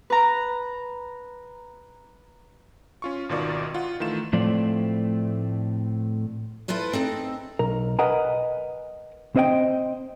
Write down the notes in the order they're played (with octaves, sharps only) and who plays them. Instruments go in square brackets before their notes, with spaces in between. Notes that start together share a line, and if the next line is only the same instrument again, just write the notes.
[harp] B4 A#5
[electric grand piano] C#4 F4 C#6
G#1 B2 D#3 F4 D5 C#6
F4 F#5
D#3 E3 A3 F4 E7
[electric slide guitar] A2 F3 A3 C4 D5
[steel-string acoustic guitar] E4 F4 A4 B4 C5
C4 D#4 A4
[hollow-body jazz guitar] B1 A#4
A#4 B4 D#5 F#5 G#5 A#5
C4 C5 D#5 F#5 G5